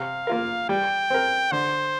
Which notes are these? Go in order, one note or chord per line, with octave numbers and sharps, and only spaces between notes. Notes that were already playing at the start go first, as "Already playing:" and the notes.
Already playing: C3 F5
A#3 F4 A#4
G3 G5
C4 A#4
D3 C5